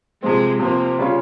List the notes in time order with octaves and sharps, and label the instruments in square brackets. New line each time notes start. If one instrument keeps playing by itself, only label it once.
[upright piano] C3 F3 C4 [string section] G#3
[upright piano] C3 F3 C4 [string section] A#3
[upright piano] C#3 G3 C#4 F4